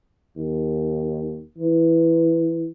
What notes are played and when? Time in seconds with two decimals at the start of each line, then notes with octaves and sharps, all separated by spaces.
0.36 D#2
1.58 E3